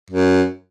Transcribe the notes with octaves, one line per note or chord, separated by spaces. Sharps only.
F#2